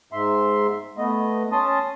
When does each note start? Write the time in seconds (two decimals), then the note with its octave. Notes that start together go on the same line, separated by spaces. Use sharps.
0.13 G#2 E5 C6
0.98 A3 B3 D#5
1.52 C#4 A5 C6 D#6